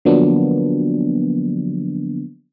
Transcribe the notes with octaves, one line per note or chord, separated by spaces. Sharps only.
D3 F3 F#3 A#3 B3 D4